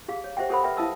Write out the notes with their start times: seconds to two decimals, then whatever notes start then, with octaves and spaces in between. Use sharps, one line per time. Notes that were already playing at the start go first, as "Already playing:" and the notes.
0.08 G4 G#4 F5
0.24 C#5
0.37 G4 C5 E5 F#5 G5
0.49 G4 A4 A#4 C5 F#5 B5
0.64 B4 E5 G5
0.77 E4 E5 F5 A5 D#6 E6